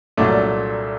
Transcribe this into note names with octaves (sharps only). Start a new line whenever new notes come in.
C2 A#2 F#3 A3 D4